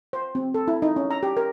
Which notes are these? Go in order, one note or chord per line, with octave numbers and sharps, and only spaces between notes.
C5
C4
A4
E4
D#4
C#4
A#5
G4
A#4